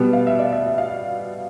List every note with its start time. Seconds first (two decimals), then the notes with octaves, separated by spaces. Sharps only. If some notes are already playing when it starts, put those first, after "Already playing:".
Already playing: B2 G3 B3
0.13 F5
0.27 E5
0.39 D5
0.53 E5
0.66 E5
0.78 F5